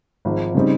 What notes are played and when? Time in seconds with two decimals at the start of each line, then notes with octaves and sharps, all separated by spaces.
0.25 G#1 G#2 F3
0.54 C#3 G3 C4 D#4